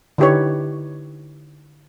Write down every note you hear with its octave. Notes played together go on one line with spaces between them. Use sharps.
D3 D#4 E4 G4 B4 C#5